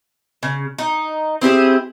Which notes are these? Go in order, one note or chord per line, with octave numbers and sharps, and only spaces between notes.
C#3
D#4
C4 E4 G4 G#4